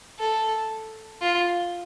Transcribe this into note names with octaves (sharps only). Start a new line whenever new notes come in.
A4
F4